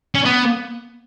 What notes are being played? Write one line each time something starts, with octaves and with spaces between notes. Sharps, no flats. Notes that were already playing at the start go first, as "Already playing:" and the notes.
C#4
B3